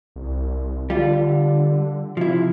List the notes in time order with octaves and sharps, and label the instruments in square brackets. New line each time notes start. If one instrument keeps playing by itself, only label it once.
[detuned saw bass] C2
[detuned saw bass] D3 [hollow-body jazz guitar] G3 F4
[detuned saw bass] C3 [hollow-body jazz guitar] F3 E4